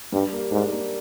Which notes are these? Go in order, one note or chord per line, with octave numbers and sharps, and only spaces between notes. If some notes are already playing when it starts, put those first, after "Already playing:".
G2 G3
A#3
G#2 D4
A#3